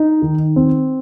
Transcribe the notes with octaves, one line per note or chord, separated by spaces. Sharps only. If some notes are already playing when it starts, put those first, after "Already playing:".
Already playing: D#4
D#3
C4